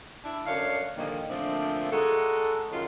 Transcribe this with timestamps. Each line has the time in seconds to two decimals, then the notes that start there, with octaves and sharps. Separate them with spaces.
0.25 D4 E4 E5
0.46 F#2 D3 D4 C#5 F5
0.98 A#2 D3 D#3 F3 G3 A#3
1.29 A#2 D3 F3 A3 C4 D4
1.92 G#3 D#4 F#4 A4
2.72 F#2 D#3 G#3 F4